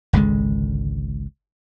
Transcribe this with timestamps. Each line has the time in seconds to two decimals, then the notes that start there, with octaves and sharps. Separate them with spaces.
0.13 G#1 C#2 D3 G#3